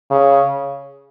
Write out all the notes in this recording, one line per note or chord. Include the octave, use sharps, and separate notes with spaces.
C#3